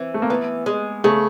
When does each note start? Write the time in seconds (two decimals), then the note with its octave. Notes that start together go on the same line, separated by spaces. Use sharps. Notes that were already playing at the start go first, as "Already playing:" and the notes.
Already playing: E3 C4
0.14 A3
0.22 A#3
0.30 E3 B3
0.66 G#3
1.04 C#3 A3